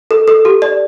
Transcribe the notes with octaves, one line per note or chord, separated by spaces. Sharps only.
A4
A4
G4
D5